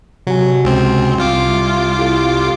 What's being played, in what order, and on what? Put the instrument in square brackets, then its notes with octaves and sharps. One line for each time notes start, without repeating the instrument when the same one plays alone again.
[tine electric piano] C3 F#4 G#5 [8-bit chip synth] F#3
[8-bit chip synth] C#2 C4
C2 F4 D6
[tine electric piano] G3 E5
E4 G4 A4